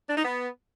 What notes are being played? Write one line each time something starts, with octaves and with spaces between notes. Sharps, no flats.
D4
D#4
B3